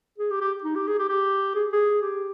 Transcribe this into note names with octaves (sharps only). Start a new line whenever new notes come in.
G#4
G4
G4
D#4
G4
G#4
G4
G4
G#4
G#4
G4